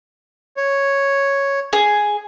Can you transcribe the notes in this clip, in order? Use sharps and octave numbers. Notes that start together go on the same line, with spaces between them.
C#5
G#4